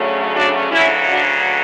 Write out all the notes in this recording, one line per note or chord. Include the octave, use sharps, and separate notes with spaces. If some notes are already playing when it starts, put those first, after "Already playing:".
Already playing: D2 C#3 F#3 A3 C#4
D4 F#4
D2 C#3 F#3 C#4 E4
D4 F#4